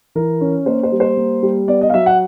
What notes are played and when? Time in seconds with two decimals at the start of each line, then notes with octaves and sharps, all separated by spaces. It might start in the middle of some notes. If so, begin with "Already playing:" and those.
0.15 E3 A#4
0.41 C#4
0.66 A#3 C5
0.83 C5
0.92 G3
1.00 C5
1.17 A#3
1.43 G3
1.68 B3 D5
1.81 D#5
1.90 F5
1.94 F#3 E5
2.06 F#5